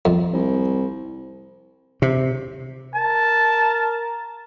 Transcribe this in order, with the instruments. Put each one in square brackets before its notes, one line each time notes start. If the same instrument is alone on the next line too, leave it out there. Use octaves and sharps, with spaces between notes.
[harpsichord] F2
[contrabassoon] C2
[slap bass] C3
[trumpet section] A#4 [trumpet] A5